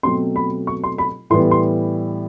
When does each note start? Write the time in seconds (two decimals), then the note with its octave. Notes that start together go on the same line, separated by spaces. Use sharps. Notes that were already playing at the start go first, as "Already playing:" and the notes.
0.03 B2 F#3 A3 C4 C6
0.36 B5
0.67 C#6
0.84 C6
0.98 B5
1.30 A2 E3 G3 B3 C6
1.51 C6